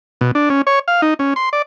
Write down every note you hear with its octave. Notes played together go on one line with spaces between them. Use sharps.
B2
D4
C#4
C#5
F5
D#4
C#4
C6
D5